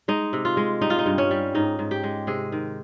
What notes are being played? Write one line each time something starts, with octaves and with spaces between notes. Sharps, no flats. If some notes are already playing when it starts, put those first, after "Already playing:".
G#3 D#4
C3
F4
G#3
G3 D#4
F4
D#4
G2
C#4
G3
G#2 D#4
G#2
G4
G#3
C3 G#4
D#3